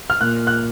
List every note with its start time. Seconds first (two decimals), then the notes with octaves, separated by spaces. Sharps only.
0.10 F6
0.21 A#2 F#6
0.47 F#6